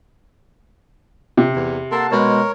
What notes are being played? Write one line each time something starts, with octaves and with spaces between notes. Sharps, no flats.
C3
E2
A#3 A4 F#5 A5 C6
B2 G#3 A#4 C#5